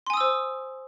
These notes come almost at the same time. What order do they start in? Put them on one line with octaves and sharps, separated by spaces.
C6 G#5 D#6 E6 C5